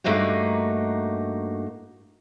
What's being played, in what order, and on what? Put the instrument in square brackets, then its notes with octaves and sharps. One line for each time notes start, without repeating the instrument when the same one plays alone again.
[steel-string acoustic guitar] G2 A3 A#3 D#4 F#4 G4